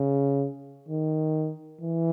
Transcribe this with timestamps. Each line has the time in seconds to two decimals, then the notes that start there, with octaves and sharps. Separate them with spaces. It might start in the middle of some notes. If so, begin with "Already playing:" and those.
Already playing: C#3
0.89 D#3
1.81 E3